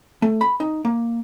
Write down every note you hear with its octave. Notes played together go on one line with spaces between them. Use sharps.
A3
B5
D#4
A#3